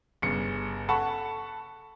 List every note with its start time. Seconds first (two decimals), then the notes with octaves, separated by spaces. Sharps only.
0.22 G1 C#3 C#7
0.89 A4 F#5 A5 B5 C#6